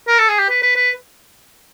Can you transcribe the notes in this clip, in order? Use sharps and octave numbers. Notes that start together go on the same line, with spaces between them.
A#4
A4
G#4
G4
B4
B4
B4